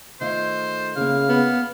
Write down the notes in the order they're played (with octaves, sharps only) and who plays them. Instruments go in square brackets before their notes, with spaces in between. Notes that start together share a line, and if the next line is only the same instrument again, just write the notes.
[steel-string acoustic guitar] D#3 A3 F4 [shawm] C5
[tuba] C#3 [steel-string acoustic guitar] A#3 E4 [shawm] F5
[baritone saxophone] B3